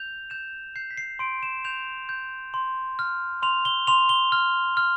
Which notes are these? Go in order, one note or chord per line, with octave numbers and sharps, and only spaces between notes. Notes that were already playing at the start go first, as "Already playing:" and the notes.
Already playing: G6 F7
G6 E7
G6 C7
B6
C7
C6 D7
E7
G6 F7
G6
C6
F6
C6 F7
G7
C6 F7
G7
F6
F6